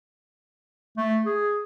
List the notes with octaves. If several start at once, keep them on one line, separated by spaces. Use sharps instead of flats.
A3
G#4